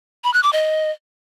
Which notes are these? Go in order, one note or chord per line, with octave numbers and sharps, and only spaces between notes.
B5
F#6
D6
D#5